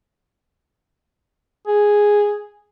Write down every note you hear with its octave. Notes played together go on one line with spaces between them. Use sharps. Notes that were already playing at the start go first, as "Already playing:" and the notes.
G#4